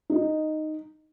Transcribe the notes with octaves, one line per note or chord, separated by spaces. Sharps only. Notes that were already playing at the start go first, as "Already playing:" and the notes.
D#4